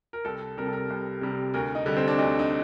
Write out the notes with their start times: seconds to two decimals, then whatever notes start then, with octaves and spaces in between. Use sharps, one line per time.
0.13 A#4
0.25 C2 A4
0.58 C3 G3 A#4
0.66 A4
0.73 A#4
0.90 C2
1.21 C3 G3
1.54 D2 A#4
1.75 D#4
1.86 D3 G3
1.97 C4
2.08 D4
2.18 D2 D#4
2.39 D#4